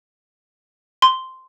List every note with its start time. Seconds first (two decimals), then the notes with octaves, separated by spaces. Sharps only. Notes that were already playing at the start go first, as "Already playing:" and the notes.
1.02 C6